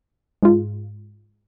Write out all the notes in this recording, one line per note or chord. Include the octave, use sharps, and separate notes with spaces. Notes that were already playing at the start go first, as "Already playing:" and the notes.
G#2 G#3 F4